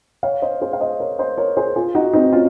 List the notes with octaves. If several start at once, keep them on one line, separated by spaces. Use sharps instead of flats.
C#5 F5
C5 D#5
G#4 C5
F5
C5 D#5
A#4 C#5
C5 D#5
A#4 C#5
G#4 C5
F4 G#4
D#4 F#4
C4 D#4
C#4 F4